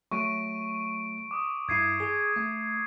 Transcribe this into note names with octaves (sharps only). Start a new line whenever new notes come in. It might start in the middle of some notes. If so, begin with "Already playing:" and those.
F#3 A3 C#6 D7 D#7
D6 D#6
G2 E4 G#6 C7 D#7
G#4
A3